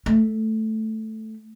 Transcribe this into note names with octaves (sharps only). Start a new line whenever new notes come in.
A3